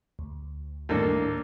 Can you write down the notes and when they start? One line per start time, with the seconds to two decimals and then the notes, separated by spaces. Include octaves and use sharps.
0.19 D2
0.89 D#2 A2 A#3 D4 A4 A#4